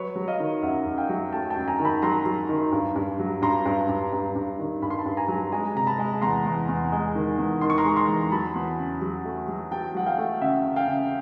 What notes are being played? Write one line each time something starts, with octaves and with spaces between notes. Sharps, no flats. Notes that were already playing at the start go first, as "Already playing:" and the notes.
Already playing: F#3 B4 C#5
F#3
D#5 F5
D#3
F#2 E5 F#5
F#2
F5 G5
F#3
A3 G5 A5
G5 A5
F#2
G#5 A#5
D#3
A5 B5
F#3 A#5 C6
F#3
D#3
G2
G2
F#3
G2 A#5 C6
G2
G2
G2
G2
D#3
G2 B5
C6
A5 B5
G2
G#5 A#5
F#3
G#3 G#5 A#5
C3 A#5
A5 B5
G#3
E2 A#5 C6
E2
E2
G#3
D#3
E2
D#3 C6
C#6
A#5 C6
G#3
A#5 C6
E2
F#3 A5 B5
E2
C#3
F#3
A3
F#3
F#3 G5 A5
F#3 F#5
F5 G5
A3
C#3 E5 F#5
C#3
F5 G5
C#3